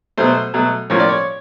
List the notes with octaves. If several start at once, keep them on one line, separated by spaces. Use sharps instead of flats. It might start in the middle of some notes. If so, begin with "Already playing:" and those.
B2 F#3 A3 C5
B2 F#3 A3
A2 F3 A#3 C#4 F4 C#5
D5
C#5